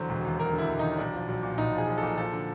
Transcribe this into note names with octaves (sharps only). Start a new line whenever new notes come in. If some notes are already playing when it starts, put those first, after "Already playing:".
Already playing: E2 D3 F#3 C5
E1
D#2
F#3 A#4
D3
E4
E1
D#2 D#4
B1 D4
F3
B1
A#2
B1 D#4
F3 G#4
B1
A#2 A4
F3 A4
D3